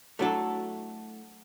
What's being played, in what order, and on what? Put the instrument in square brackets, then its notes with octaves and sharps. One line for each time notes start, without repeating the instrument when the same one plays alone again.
[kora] F#3 D4 [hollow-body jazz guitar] A3 E4 A4